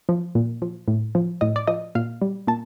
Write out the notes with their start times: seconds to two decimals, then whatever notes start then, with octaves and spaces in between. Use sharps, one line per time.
0.09 F3
0.35 A#2
0.62 F3
0.88 A2
1.15 F3
1.41 A2 D#5
1.56 D5
1.67 F3 D#5
1.95 A#2 F5
2.22 G3
2.47 A#2 A5